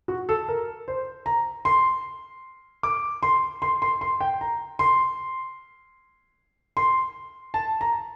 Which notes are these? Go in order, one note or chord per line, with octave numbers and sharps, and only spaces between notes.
F#4
A4
A#4
C5
A#5
C6
D6
C6
C6
C6
C6
G5
A#5
C6
C6
A5
A#5